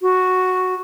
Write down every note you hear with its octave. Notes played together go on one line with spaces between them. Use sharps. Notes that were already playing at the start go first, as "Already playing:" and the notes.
F#4